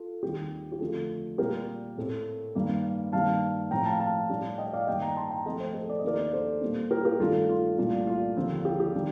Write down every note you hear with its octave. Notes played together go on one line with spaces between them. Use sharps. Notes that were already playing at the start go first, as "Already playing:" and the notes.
Already playing: F4 A4
D#2 D#3 G3 C4 G4
G4
F2 D3 A3 F4 A4
A#2 G3 C4 G4 A#4
A2 A3 C4
G2 D#3 A#3
G2 D#3 G3 A#3 F5 A5
A2 F3 C4 G5 A#5
F5 A5
F5 A5
A2 G3 D4
D#5 G5
D#5
D5 F5
G2 D#3 G3 A#3 D#5 G5
G5 A#5
A5 C6
G5 A#5
C3 F3 A3 C4 D#5 G5
C5 D#5
A4 C5
D5
D#5
D#2 D#3 A#3 D4 A#4 D5
A4 C5
A#2 G3 A#3 D4
G4 A#4
G4 A#4
G2 D#3 A3 D4 F4 A4
F4
C2 A#2 A3 D4
F4
D#2 D3 F3 C4
G4
G4
D#3 G3 D4